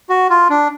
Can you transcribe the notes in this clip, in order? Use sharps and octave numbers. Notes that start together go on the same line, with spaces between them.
F#4
F4
D4